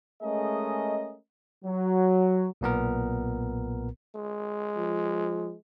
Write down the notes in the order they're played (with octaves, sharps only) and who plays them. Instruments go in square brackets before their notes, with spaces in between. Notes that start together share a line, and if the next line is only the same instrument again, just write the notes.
[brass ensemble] G#3 A3 C#4 G#4 A#4 D#5
F#3
[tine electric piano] B1 A#2 B3 A#4
[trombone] G#3
[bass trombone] F3